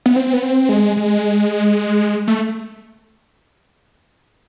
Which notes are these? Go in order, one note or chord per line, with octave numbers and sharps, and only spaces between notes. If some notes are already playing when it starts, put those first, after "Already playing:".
B3
C4
B3
C4
G#3
G#3
A3